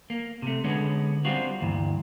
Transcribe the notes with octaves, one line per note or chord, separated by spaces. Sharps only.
A#3
C3 A3
D3 G#3 B3 C#4
G3 C4 F4 F#4
D2 G2 A#2 E3